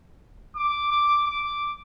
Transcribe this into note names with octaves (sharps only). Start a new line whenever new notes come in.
D6
D6
D6